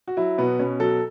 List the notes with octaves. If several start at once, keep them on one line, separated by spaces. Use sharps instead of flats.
F#4
F#3 E4
B2 B3
B2 C#4
F#3 A4